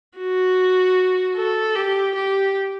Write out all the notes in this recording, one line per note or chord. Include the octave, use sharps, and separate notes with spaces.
F#4
A4
G4
G4